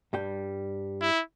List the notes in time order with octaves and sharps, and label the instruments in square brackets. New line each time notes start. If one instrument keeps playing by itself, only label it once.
[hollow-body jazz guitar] G2 G3 G5
[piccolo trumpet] E4